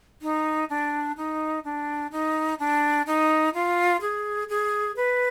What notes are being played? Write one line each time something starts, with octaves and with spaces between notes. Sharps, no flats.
D#4
D4
D#4
D4
D#4
D4
D#4
F4
G#4
G#4
B4